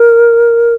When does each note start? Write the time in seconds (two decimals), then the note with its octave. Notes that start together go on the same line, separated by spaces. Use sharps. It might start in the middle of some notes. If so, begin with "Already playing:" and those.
Already playing: A#4